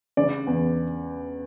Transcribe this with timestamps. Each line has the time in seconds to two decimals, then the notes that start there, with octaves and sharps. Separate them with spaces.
0.17 C#3 D5
0.47 E2